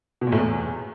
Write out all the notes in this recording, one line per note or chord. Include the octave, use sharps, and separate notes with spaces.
B2
A#2
A2
E2